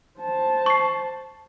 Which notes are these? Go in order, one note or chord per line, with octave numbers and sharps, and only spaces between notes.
C5 A5
C#6 C7